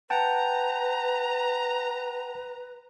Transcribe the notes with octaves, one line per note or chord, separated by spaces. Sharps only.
B4 F#5 G5 A5 A#5